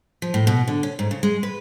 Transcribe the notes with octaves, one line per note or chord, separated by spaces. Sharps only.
F3
A2
B2
D3
C#4
G#2
C#3
G#3
B4